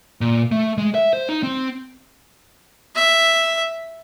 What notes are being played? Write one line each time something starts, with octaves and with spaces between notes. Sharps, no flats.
A#2
A3
G#3
E5
C5
D#4
C4
E5